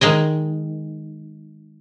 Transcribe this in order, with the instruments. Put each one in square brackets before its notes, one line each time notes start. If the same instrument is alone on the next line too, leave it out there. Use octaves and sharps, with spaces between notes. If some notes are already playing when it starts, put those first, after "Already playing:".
[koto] D#3 G#3 G#4 D#5